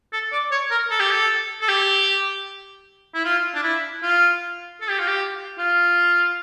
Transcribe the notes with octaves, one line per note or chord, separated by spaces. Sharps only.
A4
D5
C#5
A#4
A4
G4
A4
A4
G4
E4
F4
D4
E4
F4
A4
G4
F4
G4
F4